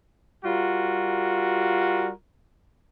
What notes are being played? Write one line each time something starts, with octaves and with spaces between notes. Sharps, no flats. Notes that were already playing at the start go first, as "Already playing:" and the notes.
G3 F4 F#4 A#4